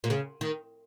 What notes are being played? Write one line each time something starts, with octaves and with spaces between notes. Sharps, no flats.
A#2
C#3
D#3